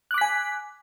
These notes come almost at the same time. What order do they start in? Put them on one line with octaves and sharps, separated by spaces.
F#6 D6 B6 G#5